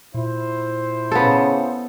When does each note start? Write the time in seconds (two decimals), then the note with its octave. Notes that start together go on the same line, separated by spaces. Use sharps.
0.14 A#2 E4 C5
1.11 C#3 B3 A4